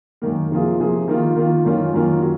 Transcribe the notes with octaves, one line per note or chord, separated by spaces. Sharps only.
F#2 D#3 A#3
C3 F3 A#3 F4 G#4
C3 F3 A#3 F4 G#4
D#3 A#3 F4
D#3 A#3 F4
F#2 D#3 A#3 C#4 F4
F#2 D#3 A#3 C#4 F4
F#3